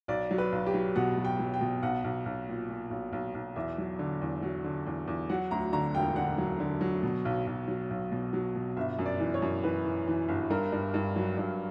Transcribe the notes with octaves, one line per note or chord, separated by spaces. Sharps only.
B1 D5
F#3
B4
B1
G4
F#3
B2 F#5
F#3
G5
F#3
G5
B2
B1 F#5
B1
B1
A#2
A#2
B1
B1
B1
E2 E5
F#3
D3
E2
F#3
D3
E2
E2
F#3 F#5
D2 A#5
D3 A#5
E1 G5
D3 F#5
F#3
D3
F#3
B2
B1
B1
F#3
B1
B2
F#3
B2
G1 E5
F#2
D5
E3
C#5
F#2
E3 B4
E3
E3
G1
G2 A#4
G2
G2
F#3
G2